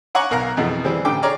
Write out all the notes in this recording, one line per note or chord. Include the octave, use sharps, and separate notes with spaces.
C#5 F#5 G#5 A#5 C#6 D6
B1 A#4 F5 A#5 F#6
F2 B2 E3 G#3
E3 G3 C4 G#4
A1 D3 G5 D6
G#4 C#5 D5 A#5 F6